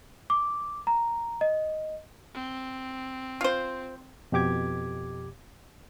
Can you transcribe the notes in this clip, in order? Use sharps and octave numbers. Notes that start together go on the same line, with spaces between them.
D6
A#5
D#5
C4
F4 C5
F2 B2 G4 D6 G#6